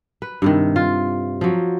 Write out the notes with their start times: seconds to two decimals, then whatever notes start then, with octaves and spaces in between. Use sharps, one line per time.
0.22 B4
0.42 G2 C3 D#3
0.76 F4
1.41 F3 F#3